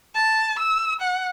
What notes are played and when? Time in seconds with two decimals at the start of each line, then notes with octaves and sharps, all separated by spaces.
0.15 A5
0.59 E6
1.01 F#5